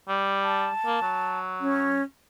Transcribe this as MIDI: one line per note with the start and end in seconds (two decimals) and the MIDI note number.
0.08 0.69 55
0.43 1.39 81
0.86 0.98 58
1.02 2.01 54
1.60 2.03 61